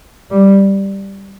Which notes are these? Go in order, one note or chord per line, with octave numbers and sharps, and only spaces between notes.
G3